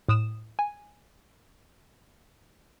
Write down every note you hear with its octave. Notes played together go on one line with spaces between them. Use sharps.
A2 D#6 E7
G#5